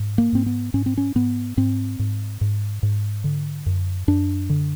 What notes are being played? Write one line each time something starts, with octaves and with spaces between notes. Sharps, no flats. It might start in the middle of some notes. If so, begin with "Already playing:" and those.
Already playing: G#2
A#3
G#2 C4
B3
G#2 C#4
C4
C#4
G#2 B3
G#2 C4
G#2
G#2
G#2
D3
F#2
F#2 D4
D3